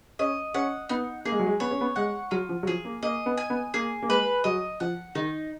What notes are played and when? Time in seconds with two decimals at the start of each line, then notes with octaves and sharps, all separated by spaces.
0.19 C#4 D#5
0.54 C#4 F#5
0.89 B3 D#4
1.25 A#3 G#4
1.32 G#3
1.40 F#3
1.46 G#3
1.60 B3 C#5
1.71 C#4
1.81 B3
1.96 G#3 F#5
2.31 F#3 F4
2.49 F3
2.63 F#3
2.67 F3 G#4
2.85 A#3
3.03 A#3 D#5
3.26 B3
3.38 G#5
3.50 B3
3.74 A#3 G#4
4.02 A#3
4.09 G#3 B4
4.44 F#3 D#5
4.80 F3 F#5
5.15 D#3 D#4